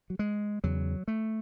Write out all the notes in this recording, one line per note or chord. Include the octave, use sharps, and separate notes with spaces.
F#3
G#3
E2 C#3 F#3
A3